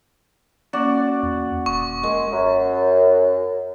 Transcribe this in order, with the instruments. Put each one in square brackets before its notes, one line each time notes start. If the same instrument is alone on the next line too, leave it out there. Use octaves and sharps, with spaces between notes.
[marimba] A#3 C#4 D6 [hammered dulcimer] F#4 D5
[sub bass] E2
[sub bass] D#1 [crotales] C#6 [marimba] D#6
[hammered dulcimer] G#3 [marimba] A#4
[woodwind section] F#2